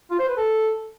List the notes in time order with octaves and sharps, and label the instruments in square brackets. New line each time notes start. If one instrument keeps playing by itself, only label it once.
[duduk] F4
C5
B4
A4